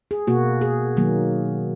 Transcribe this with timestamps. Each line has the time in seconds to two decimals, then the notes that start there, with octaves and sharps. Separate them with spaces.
0.11 G#4
0.27 B2 A#3 F#4
0.61 G#4
0.97 D#3 F#3 A#3